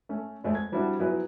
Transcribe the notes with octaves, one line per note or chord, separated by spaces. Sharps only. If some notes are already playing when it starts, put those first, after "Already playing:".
A3 C#4
F2 G#3 A3 C4
G#6
F3 G3 C4 D4 E4 F#4
F3 F#3 B3 E4 G#4 B4